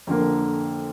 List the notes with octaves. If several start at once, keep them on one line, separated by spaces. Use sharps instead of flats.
F2 D3 A#3